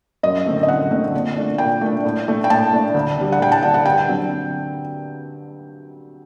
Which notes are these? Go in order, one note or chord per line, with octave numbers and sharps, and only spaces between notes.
F#2 D#5
D3 A3 C4
D#5
F#2 F#5
D3 A3 C4
A#2
A3 D4
A#2 G5
A3 D4
A2
A3 D4
G5
A2 A5
A3 D4
D2
D3 G3
F#5
D2 G5
A5
D3 G3 F#5
F#5
G2 G5
D3 F#3 C4